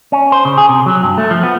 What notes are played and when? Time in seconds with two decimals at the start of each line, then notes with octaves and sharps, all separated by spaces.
0.12 C#4
0.32 C5
0.45 C#3
0.58 G#4
0.69 C3
0.86 F#3
1.02 G2
1.18 A3
1.31 F3
1.43 B3